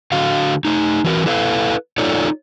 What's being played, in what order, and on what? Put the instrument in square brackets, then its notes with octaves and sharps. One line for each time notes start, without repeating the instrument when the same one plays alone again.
[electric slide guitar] D3 F#4 F5
A3 D#4
E3 F#4 A#4
E4 A4 B4 F5
D#4 F4 A4 C#5 D5